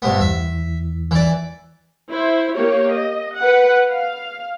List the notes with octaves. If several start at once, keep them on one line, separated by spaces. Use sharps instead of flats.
G2 C3 B3
E2 E5
E3 D5
E4 C5
A#3 G4 C#5
D#5
B4 F#5
F5